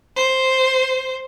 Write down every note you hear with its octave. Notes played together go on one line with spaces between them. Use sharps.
C5